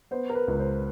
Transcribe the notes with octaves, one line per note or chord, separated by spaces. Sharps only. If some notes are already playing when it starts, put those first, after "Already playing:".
B3 C5
A#4
B4
C#2
C5